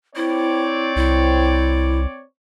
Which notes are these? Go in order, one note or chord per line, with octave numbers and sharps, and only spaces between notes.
C4 E4 C#5 D5
C2 E4